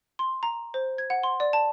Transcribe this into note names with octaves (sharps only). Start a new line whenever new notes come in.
C6
A#5
C5
G#6
F#5
C6
D5
A5